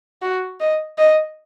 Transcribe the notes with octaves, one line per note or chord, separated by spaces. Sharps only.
F#4
D#5
D#5